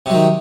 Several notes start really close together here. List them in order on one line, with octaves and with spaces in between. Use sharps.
C3 F#3 D#3